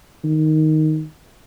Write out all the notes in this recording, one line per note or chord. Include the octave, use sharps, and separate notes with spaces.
D#3